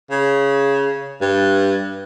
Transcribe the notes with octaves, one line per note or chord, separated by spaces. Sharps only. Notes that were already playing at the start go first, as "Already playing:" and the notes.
C#3
G2